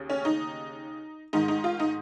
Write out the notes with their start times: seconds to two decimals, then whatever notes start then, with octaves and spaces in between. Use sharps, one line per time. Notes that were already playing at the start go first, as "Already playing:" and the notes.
Already playing: D#2 C#3
0.10 C#4
0.25 D#4
1.33 G#2 D#3 G#3 D#4
1.48 D#4
1.64 F4
1.80 D#4